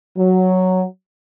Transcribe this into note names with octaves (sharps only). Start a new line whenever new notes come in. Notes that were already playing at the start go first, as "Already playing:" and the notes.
F#3